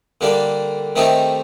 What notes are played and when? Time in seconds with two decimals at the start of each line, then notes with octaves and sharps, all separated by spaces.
0.21 D3 G3 A#3 D4
0.96 D#3 A3 C4 D#4 G4